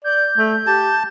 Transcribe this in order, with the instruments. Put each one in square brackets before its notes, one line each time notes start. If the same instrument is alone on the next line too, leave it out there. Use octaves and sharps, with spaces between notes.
[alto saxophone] D5 [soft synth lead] G6
[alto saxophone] A3
[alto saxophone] G4 [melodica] A5